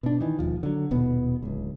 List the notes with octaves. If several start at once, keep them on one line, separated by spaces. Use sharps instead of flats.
B2 D4
D#3 E3
E1 D#2 F3
D3 F#3
D#1 B2 B3
D1 C#2